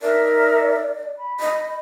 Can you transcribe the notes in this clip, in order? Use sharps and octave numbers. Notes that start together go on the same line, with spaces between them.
D#4 A#4 D5 E5
B5
D#5